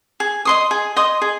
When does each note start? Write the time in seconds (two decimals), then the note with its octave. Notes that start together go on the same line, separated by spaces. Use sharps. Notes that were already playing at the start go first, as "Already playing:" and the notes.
0.20 G#4
0.45 D#5 C6 D#6
0.71 G#4
0.96 D#5 C6 D#6
1.22 G#4